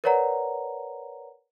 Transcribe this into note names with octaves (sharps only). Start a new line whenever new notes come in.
A#4 B4 C#5 D5 F#5 A#5